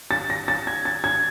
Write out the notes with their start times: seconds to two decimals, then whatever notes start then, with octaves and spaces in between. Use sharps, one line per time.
0.11 A6
0.30 A#6
0.48 A6
0.67 G#6
0.85 A6
1.04 G#6